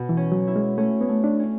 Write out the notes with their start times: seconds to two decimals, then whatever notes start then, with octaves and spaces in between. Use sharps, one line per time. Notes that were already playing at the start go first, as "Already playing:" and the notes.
Already playing: B2
0.09 E3
0.17 C#4
0.32 F#3
0.47 E4
0.56 G#3
0.78 A3 C#4
1.01 B3
1.09 A3
1.24 D4
1.39 C#4